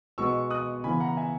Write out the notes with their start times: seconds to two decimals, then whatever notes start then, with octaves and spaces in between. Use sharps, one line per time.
0.18 B2 G#3 B3 C#6 E6
0.51 D#6 F#6
0.84 C#3 E3 B3 G#5 B5
1.00 F#5 A#5
1.17 E5 G#5